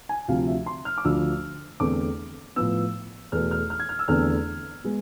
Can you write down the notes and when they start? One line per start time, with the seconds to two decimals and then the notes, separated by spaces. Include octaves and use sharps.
0.09 G#5
0.28 D2 C3 F3 F5
0.47 E5
0.66 C6
0.85 F6
0.98 D6
1.04 D2 D3 F3 E6
1.80 E2 D3 A3 C4 D6
2.56 A2 F3 B3 E6
3.32 E2 B2 A3 F6
3.51 F6
3.70 F6
3.80 G#6
3.89 F6
3.99 E6
4.08 E2 D3 A3 C4 F6
4.84 G#3 B3